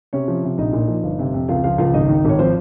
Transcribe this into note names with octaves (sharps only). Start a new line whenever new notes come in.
C3 C#4 C#5
F3
C3
A#1 D#4 D#5
A#2
F3
G1
C3
F2
C#2 F4 F5
F3 F4 F5
C#2 F4 F5
G#1 D#4 D#5
D#3
G#1 C#5
F3 C4 C5